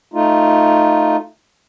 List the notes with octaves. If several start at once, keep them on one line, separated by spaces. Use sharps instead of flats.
A3 D#4 F4